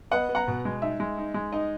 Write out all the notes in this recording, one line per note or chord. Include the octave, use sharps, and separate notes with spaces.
B3 D#5 F#5
B3
F#5 A#5
B2
G#3
D#4 E5
G#3
D#4
G#3
D#4 D#5